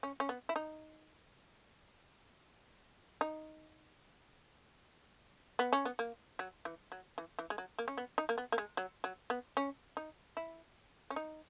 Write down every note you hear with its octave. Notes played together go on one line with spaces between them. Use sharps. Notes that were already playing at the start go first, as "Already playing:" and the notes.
C#4
C#4
B3
E4
D#4
D#4
B3
C#4
B3
A#3
F#3
E3
F#3
E3
E3
G#3
F#3
A#3
C#4
B3
D#4
A#3
B3
A#3
G#3
F#3
F#3
B3
C#4
D#4
E4
C#4
D#4